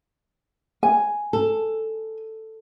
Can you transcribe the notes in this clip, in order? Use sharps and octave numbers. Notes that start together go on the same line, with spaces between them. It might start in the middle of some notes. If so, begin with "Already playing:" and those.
G#5
A4